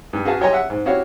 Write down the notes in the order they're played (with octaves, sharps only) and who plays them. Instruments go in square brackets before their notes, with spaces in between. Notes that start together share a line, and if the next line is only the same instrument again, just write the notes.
[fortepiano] G2
F#4 G#4 B4 F5 A5
G4 C#5 D#5 G#5 A#5 C6
E5 F#5
G#2
E4 F#4 G4 C#5 F5